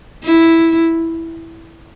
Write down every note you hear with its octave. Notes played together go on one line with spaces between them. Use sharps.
E4